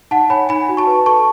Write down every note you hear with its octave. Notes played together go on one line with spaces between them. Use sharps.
D#4 F#5 A5
C#5 G#5 B5
D#4 G#5 B5
F#4
A5 C#6
B4
A4 A5 C#6